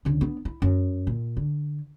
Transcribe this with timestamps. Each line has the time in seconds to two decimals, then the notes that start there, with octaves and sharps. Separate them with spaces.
0.05 C#2 D3
0.21 B3 D4
0.45 E4
0.62 F#2
1.07 A#2
1.37 D3